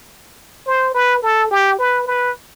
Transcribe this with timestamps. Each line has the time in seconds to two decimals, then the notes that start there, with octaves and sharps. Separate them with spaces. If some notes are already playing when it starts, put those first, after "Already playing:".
0.67 C5
0.94 B4
1.23 A4
1.51 G4
1.79 B4
2.07 B4